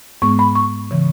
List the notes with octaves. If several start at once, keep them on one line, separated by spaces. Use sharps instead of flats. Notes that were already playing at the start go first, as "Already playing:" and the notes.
G#2 G#3 B3 C#6
B5
C#6
C#3 E3